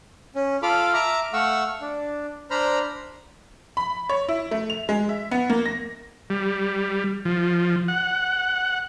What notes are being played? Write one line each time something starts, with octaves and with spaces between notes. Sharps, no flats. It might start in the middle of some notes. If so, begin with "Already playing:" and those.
C#4
F4 A4 B5 D6 F6
E5 A#5 D6 F6
A3 F5 F#5 C#6 E6
D4
D4 C5 A#5 B5 F6
B5
C#5
E4
A3
F7
G#3
E5
B3
A#3
A#6
G3
F3
F#5